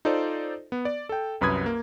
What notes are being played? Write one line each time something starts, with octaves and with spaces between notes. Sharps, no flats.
D#4 F4 A4 C5 D5
B3
D5
A4 G5
C2 F#2 B4 B5 D#6 G#6
A#3